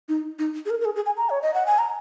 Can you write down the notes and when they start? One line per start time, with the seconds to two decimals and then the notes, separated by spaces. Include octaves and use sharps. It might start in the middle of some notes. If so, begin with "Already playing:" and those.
0.09 D#4
0.39 D#4
0.66 G#4
0.70 A#4
0.81 A#4
0.85 G#4
0.96 G#4
1.06 G#5
1.17 A#5
1.30 C#5
1.42 D#5
1.54 F#5
1.66 G#5
1.79 A#5